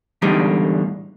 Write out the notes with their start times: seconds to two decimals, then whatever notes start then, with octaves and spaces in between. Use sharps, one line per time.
0.22 E2 A2 D3 G3 G#3 D#4